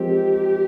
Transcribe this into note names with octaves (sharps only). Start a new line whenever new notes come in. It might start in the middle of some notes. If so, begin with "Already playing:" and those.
Already playing: F3 G#3 C4 G4 A#4